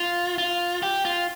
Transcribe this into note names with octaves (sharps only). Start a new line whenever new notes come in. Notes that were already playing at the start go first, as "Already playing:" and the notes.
Already playing: F4
F4
G4
F4